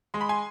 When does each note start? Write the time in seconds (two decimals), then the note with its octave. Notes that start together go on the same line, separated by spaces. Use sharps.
0.14 G#3 C6
0.21 B5
0.29 G#5 C6